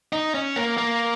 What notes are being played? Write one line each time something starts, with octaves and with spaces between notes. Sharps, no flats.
D#4
C#4
A#3
A#3